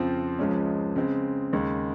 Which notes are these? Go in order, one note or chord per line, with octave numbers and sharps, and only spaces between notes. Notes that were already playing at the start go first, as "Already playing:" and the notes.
Already playing: F2 C#3 F3 C4 F4
C#2 C#3 F3 G#3 C#4
C#3 G#3 C4
D#2 C#3 G#3